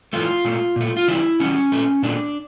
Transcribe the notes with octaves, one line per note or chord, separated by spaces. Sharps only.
A2 E3 A3 F4
A#2 A3
A#2 A3
F4
C#3 E3 G3 E4
C#3 E3 G3 C#4
A#2 A3
A#2 A3 D4